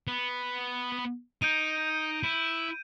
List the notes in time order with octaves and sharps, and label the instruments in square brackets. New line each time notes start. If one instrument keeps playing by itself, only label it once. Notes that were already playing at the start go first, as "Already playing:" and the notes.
[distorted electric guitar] B3 B4
[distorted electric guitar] D#4 [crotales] G6 D7 D#7
[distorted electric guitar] E4